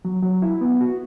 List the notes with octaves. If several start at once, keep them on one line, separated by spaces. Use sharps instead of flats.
F#3
F#3
E4
B3
F#4